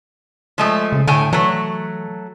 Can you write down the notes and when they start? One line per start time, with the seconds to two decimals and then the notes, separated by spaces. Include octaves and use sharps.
0.58 F3 G#3 A3
0.92 C#3
1.07 A2 D3 G5 G#5
1.33 E3 F#3 A3